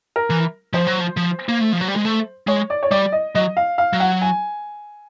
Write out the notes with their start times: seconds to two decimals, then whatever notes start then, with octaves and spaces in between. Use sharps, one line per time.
0.16 A#4
0.30 E3
0.73 F3 C5
0.87 F#3
1.00 F3
1.17 F3
1.49 A#3
1.61 A3
1.73 F3
1.81 F#3
1.88 G3
1.96 G#3
2.05 A3
2.47 G#3 C#5
2.70 D5
2.83 C#5
2.91 G3 D5
3.12 D#5
3.35 F#3 D#5
3.57 F5
3.78 F5
3.93 F#3
4.00 F#5
4.22 G#5